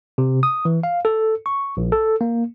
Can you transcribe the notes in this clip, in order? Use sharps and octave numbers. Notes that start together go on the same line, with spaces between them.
C3
D#6
E3
F5
A4
C#6
A#1
A4
A#3